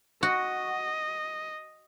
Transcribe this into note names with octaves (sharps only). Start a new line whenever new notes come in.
F#4 D#5